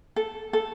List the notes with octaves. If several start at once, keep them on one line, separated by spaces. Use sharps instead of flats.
A4
A4